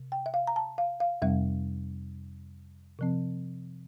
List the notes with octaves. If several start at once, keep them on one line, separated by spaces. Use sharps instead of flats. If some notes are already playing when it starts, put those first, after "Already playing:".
Already playing: C3
G5
E5
F5
A#5
A5
F5
F5
F2 C3 G3 C4 E5
C3 F3 C4